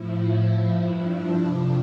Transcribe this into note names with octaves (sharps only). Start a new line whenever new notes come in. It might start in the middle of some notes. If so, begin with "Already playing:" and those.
Already playing: A2 F3 E4
E4
G2 F3
D4
F2 C3 F3 D4